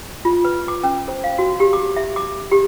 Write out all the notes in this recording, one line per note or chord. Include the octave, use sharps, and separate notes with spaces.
F4
B4
D6
C#4
C5
F5
F#4
G4
D6
E5
D6
G4